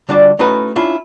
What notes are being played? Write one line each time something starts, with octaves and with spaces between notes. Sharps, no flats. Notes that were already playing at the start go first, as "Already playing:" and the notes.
D3 G3 D4 F4 F#4 D5
A3 C#4 D#4 E4 F#4 B4
C#4 D4 E4 F4